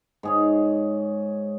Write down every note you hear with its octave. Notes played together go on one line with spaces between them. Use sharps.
G#2 G#4 C#5